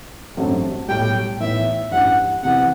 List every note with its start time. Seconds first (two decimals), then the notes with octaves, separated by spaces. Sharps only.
0.37 A1 G2 F#3 A3 C4
0.88 B1 A2 G3 G5
1.40 A2 E3 B3 D#4 E5
1.91 A1 G2 E3 F#5
2.43 C2 C3 E3 F#5